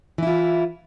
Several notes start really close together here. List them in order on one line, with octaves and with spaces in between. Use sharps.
E3 E4 F4